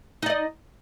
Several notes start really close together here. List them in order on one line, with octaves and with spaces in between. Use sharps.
D#4 D5 D#5